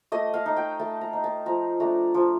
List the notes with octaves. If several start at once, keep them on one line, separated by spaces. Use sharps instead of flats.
A3 D#5
F5
D#4
G5
A3 A5
A#5
D#4
A5
F3 A#5
A3 D4 A#5
F3